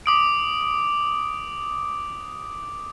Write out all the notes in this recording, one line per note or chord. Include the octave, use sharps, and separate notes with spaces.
D6 D#6 D7